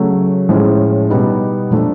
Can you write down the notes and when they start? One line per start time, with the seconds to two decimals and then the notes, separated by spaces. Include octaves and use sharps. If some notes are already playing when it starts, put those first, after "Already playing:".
Already playing: C#3 F#3 A3
0.49 A2 F3 G#3 C#4
1.10 B2 G3 B3 D#4
1.71 A#2 F3 A3 D4